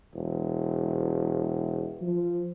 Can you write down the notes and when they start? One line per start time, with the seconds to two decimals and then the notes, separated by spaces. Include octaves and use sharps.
0.14 E1
2.02 F3